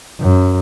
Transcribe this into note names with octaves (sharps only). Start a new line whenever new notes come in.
F#2